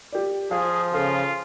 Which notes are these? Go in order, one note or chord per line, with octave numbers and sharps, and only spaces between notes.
G4 D5
F3 G#4 F5
C#3 F4 A4